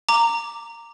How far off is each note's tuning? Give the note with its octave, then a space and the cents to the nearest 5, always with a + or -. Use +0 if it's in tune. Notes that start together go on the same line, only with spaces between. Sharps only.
A#5 -10 D6 +0